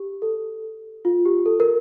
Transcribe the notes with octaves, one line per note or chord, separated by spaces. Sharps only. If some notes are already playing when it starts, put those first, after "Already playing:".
Already playing: G4
A4
F4
G4
A4
A#4